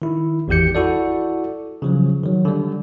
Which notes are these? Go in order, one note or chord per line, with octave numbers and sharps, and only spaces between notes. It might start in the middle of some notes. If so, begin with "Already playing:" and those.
D#3 E4
G#1 E2 E3 G4 G6 C#7
E4 F#4 A4 D5
C#3 F3 F#3
D#3 F#3
D3 G3